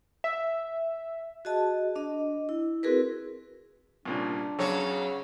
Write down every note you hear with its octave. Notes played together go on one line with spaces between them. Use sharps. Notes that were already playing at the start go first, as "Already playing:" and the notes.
E5
F#4 G#4 D#5 A5
D4 D#5
E4
C4 E4 F#4 G#4 A#4 B4
C2 A#2 C#3 D4
B1 C#3 F#3 C#5